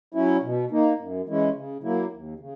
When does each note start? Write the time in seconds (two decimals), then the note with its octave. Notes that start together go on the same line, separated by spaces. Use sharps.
0.14 F#3 C#4 E4
0.43 B2
0.71 A#3 D#4
0.99 F#2
1.27 E3 G#3 C#4 E4
1.55 C#3
1.83 F#3 A#3 E4
2.12 D#2
2.40 C#3